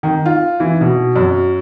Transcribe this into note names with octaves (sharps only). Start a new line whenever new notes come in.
D#3
F4
E3
B2
F#2